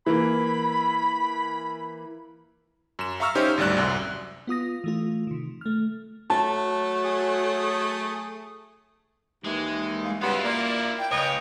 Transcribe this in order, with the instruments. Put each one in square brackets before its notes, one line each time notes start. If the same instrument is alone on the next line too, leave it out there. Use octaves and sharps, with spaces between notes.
[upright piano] E3 A#3 [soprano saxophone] B5
[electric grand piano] F#2 E7
E5 F5 A#5 C#6 E6 F6
C#4 D#4 G4 C5
G#1 D2 G3 D5 F#6
C2 F#2
[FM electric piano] B3 F4 D#6 A#6
E3 A3 F4
C3 D#3
A3 F6
[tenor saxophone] F#3 [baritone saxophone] A3 [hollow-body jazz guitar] A5
[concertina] G#4 D#6
[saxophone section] D#2 E3 [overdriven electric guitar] G#3
[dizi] F5
[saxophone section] C#3 G3 B3 [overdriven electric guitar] E4 F4 [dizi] C6
[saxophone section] A#3 [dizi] D5
[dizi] G5
[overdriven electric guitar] C#2 [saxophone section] B4 C#5 D#5